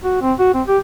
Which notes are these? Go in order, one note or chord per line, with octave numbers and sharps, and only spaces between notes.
F#4
C4
F#4
C4
G4